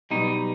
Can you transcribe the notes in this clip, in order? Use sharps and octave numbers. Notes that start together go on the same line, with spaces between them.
B1 B2 G3 D#4